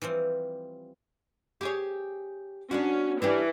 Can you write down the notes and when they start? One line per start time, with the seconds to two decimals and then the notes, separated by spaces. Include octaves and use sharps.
0.02 E3 F3 G3 C4
1.61 G4 G#4 C#5
2.71 B3 C#4 D4 F#4
3.22 E3 C#4 D4 G4